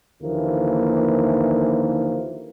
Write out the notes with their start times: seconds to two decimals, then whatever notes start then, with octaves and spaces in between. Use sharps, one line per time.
0.21 D#2 D3 E3 F3 A#3